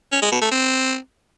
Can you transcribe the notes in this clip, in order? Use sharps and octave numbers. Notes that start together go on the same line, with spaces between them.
C#4
G#3
B2
A3
C4